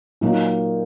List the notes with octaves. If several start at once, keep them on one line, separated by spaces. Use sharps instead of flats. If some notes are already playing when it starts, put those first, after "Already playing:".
A#2 F#3 A#3 D#4